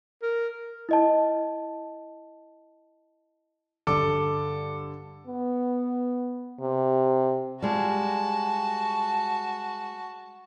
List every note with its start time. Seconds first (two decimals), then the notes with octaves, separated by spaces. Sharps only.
0.22 A#4
0.89 E4 D#5 A5
3.87 G2 D3 A4 D6
5.27 B3
6.60 C3
7.62 G3 G#3 F4 F#4 A5